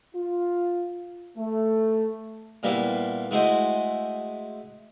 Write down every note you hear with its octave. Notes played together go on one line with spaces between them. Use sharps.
F4
A3
A#2 G3 A#3 B3 E4
G#3 A3 E4 F#4 C5 D#5